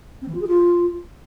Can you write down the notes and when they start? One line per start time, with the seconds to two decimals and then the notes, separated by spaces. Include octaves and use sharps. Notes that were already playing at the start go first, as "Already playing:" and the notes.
0.22 C4
0.28 E3
0.34 F4
0.41 G#4
0.47 F4